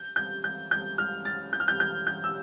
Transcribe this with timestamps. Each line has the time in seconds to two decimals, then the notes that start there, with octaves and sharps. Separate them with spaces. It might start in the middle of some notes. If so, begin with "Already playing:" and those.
Already playing: G6
0.16 G6
0.44 G6
0.71 G6
0.98 F6
1.25 A6
1.53 G6
1.60 F6
1.68 G6
1.80 G6
2.07 G6
2.24 E6